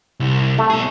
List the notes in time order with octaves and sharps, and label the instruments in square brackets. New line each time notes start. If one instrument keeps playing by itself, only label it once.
[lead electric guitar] C2
[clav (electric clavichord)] A3
[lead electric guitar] B2 G#4